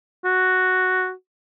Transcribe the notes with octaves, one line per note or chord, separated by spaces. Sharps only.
F#4